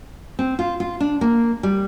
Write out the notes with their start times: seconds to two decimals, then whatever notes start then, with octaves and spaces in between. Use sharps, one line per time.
0.39 C4
0.59 F4
0.80 F4
1.00 D4
1.21 A#3
1.63 G3